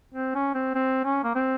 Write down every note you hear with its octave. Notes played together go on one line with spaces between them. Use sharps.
C4
C#4
C4
C4
C#4
A#3
C4